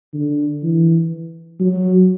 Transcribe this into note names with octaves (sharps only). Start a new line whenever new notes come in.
D3
E3
F#3